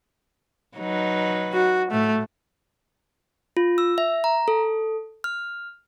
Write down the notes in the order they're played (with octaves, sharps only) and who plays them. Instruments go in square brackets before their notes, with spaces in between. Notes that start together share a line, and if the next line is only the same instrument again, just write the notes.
[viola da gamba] F#3 D#4 B4
[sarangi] F#4
[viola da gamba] A2 [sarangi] A3
[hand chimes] F4
E6
E5
A#5
A4
F6